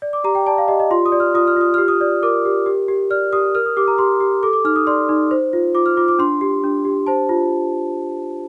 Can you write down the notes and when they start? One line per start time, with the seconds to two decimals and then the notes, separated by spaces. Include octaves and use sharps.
0.02 D5
0.13 D6
0.24 G4 A#5
0.35 G5
0.46 D5 A5
0.58 F5
0.68 G4 D#5
0.80 D#5
0.91 F4 C6
1.06 D#6
1.12 D5
1.20 F6
1.34 F4 D#6
1.47 F6
1.56 F4 D#6
1.74 G4 F6
1.88 D#6
2.01 D5
2.23 A#4 D6
2.45 G4
2.66 G4
2.88 G4
3.10 D5 F6
3.33 G4 D#6
3.55 A#4 F6
3.66 D#6
3.77 G4 D6
3.88 A#5
3.98 G4 C6
4.20 G4
4.43 A4 D6
4.53 D6
4.65 D#4 F6
4.76 D#6
4.87 D5 C6
5.09 D#4
5.31 C5
5.53 F4
5.75 F4 D6
5.86 F6
5.97 F4 D6
6.08 D6
6.19 D4 C6
6.41 G4
6.64 D4
6.85 G4
7.07 C5 A5
7.29 F4